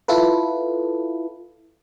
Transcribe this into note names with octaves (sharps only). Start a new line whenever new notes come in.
E4 F4 A4 B4